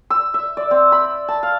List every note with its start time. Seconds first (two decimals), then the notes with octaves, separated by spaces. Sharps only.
0.10 E6
0.34 E5
0.57 D5
0.71 C4
0.92 B5
1.28 A5
1.43 F5